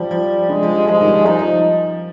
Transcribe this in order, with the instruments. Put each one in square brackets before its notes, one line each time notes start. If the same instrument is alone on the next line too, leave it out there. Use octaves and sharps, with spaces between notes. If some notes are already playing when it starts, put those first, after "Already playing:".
Already playing: [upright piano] F3 [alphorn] G3
[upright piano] F3
[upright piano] D3 [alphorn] G#3
[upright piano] F3
G3
[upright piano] F3 [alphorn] G#3
[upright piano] D#3
G3
F3
[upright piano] F3 [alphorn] D#4
[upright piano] F3